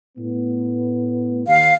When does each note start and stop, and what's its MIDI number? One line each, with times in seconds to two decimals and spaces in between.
0.18 1.45 45
0.18 1.45 59
1.47 1.71 39
1.47 1.72 77